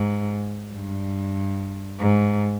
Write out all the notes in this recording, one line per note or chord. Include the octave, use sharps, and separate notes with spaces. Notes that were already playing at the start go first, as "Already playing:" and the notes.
Already playing: G#2
G2
G#2